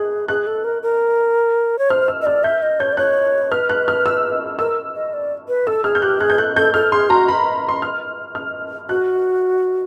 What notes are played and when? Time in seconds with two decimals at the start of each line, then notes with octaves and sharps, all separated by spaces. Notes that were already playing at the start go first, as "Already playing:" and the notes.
Already playing: G#4 F#6
0.28 G#4 F#6
0.47 A4
0.64 A#4
0.83 A#4
1.79 C#5
1.90 C5 F6
2.08 E6
2.22 D#5
2.26 D5 F6
2.43 E5 G6
2.62 D#5
2.80 C#5 G6
2.92 D5
2.97 C#5 F#6
3.51 B4 F6
3.69 F#6
3.88 F6
4.06 E6
4.59 A#4 E6
4.95 D#5
5.13 D5
5.48 B4
5.67 A4 E6
5.84 G#4 F6
5.95 G6
6.02 G4 F#6
6.20 G#4 F#6
6.30 G6
6.38 A4 F#6
6.56 A4 G6
6.74 A4 F6
6.92 G#4 C6
7.09 F#4 A#5
7.28 B5
7.69 C6
7.82 F6
8.35 F6
8.89 F#4 F#6